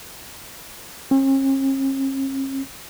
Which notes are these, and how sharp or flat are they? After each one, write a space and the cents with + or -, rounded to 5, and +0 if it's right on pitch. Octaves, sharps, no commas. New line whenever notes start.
C#4 -45